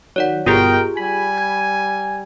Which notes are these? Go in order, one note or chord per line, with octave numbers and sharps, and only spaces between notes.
D#3 F#3 C#5 D5 F#5
G1 B2 F4 G4 G#4 A#4 D#5 G5
G3 G#5 B5
G#6